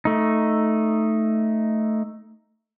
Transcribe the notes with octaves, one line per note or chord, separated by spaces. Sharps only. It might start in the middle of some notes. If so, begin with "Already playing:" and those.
A3 D#4